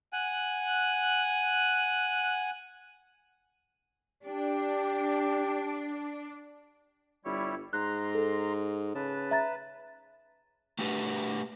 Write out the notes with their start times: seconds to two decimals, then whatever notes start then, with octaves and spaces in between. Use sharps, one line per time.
0.13 F#5 G#5 F#6
4.24 D4 G4
7.25 G1 G3 E4 C#5
7.73 G#2 A#5 C6 F#6
8.15 A4
8.95 C#3 B4 A5
9.31 E5 A#5 A6
10.79 A3 D4 F#4 G4 B4